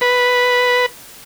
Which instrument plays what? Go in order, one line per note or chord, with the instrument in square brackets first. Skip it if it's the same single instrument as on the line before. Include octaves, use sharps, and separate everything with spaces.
[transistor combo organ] B4